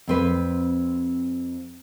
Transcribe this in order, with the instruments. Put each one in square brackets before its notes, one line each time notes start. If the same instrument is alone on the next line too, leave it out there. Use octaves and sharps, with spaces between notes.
[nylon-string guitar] F2 C4 B4